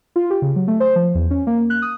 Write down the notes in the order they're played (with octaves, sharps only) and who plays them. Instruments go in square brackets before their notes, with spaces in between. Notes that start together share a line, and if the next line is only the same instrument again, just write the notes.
[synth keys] F4
G4
C#3
F#3
A3
C5
F3
E2
C#4
A#3
F#6
D#6